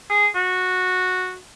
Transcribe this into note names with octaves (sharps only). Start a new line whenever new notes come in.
G#4
F#4